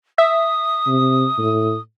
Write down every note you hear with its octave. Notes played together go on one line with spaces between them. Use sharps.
E5 D#6
C3
A2